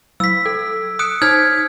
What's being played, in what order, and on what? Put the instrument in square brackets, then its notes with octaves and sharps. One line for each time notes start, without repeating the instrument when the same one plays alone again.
[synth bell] F#3 [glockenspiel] E6 B6
[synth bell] A4
[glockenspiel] D#6 [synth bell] F#6 C#7 D7
[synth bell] D#4 C5 B6 [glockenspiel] F6 G6 G#6